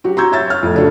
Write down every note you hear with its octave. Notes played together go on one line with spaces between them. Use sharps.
F#3 F#4 G4
A#5 C6 C#6 E6 G6 G#6
C#5 E5 E6 A6
F6
F2 A2 A3
C#3 A3 D4 F#4